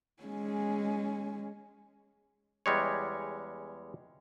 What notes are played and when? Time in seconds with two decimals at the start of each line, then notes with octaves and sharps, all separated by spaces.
0.23 G#3 C#4
2.66 E2 G3 G#3 C#5